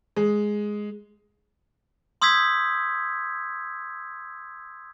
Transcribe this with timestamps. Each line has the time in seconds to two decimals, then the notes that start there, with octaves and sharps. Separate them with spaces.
0.16 G#3
2.22 C6 D#6 E6 G6 G#6 B6